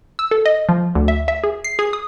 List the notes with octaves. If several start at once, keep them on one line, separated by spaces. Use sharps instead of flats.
E6
A4
D#5
F3
D2
E5
E5
G#4
C7
G#4
D#6